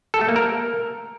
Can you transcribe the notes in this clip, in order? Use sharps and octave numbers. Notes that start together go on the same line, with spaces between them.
A4
A3
A#3
A#4